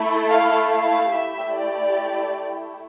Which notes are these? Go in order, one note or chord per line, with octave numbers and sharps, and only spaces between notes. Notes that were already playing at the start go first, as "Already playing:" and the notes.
Already playing: A3 E4 A4
F5
F5
A3 E4 G4 E5
D5